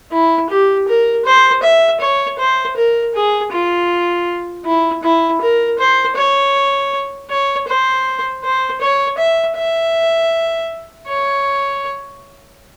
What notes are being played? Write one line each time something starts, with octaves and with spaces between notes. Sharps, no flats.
E4
G4
A#4
C5
E5
C#5
C5
A#4
G#4
F4
E4
E4
A#4
C5
C#5
C#5
C5
C5
C#5
E5
E5
C#5